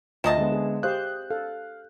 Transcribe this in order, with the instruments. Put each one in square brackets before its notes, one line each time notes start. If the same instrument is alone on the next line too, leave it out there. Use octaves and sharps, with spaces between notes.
[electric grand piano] D2 F4 E7 [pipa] C3 D#5 A5
[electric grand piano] D3 G#3 B3
[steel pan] G#4
[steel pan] G4 C5 F5 [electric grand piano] D#6 F#6 G6
[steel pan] A4 [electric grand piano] F5